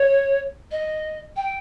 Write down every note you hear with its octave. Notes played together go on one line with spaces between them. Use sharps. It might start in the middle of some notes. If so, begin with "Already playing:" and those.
Already playing: C#5
D#5
G5